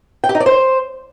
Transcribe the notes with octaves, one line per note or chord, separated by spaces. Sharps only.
G5
G4
D#4
D5
C5